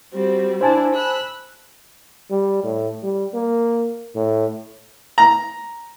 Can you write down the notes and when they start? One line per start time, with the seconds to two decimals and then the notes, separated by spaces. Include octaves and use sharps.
0.12 G3 C4 F#4
0.61 D4 E4 C5 D5 G#5 A5
0.94 B5 E6 F#6
2.30 G3
2.64 A2
3.03 G3
3.34 A#3
4.16 A2
5.18 A#5